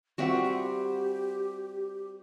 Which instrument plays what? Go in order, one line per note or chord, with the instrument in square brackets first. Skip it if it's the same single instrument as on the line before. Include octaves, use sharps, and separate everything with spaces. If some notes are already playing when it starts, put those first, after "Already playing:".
[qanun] G3 C4 [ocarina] F4 [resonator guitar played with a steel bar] F#4 E5 F#5
[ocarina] G4